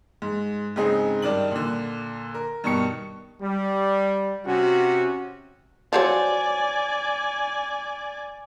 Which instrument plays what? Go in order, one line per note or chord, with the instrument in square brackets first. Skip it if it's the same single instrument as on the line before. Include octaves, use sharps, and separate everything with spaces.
[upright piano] G#2
G#2 C#3 C4 D#4 G#4
G2 D#3 D5 F#7
A#2 D3
A#4
G2 B2 D#3 C#6 C#7
[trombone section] G3
C3 C#4 F#4
[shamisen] F3 F#3 C#5 [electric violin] D5 G#5